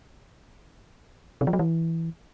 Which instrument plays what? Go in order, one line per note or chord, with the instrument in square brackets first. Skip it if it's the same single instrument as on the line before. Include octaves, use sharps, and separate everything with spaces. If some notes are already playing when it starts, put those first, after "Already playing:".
[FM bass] C3
F3
F#3
E3